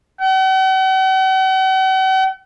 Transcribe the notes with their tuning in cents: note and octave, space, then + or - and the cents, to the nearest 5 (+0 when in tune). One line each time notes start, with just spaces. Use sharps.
F#5 +45